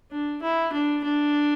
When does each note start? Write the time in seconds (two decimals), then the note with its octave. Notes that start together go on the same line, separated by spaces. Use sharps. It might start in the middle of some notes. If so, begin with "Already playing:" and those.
0.11 D4
0.42 E4
0.73 D4
1.04 D4